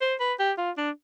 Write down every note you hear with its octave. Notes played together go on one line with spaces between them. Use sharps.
C5
B4
G4
F4
D4